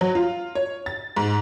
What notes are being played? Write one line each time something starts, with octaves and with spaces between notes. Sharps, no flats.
F#3
F4
C#5
A6
G#2